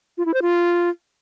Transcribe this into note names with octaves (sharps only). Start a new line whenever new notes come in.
F4
E4
C5
F4